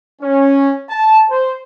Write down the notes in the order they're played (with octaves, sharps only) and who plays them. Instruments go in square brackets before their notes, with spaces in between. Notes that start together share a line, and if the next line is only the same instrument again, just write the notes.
[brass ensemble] C#4
A5
C5